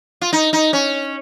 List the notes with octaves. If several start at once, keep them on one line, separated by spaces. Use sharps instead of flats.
F4
D#4
D#4
C#4